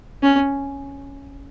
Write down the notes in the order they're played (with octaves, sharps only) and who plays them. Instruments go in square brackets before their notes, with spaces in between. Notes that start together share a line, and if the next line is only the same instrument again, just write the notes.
[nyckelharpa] C#4